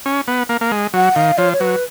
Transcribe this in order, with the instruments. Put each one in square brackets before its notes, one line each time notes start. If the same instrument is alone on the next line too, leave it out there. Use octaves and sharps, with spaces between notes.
[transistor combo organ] C#4
B3
A#3
A#3
G#3
[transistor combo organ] F#3 [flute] F#5
[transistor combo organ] D#3 [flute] F5
[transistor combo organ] F3 [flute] C#5
[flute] C#5
[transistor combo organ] F#3 [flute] B4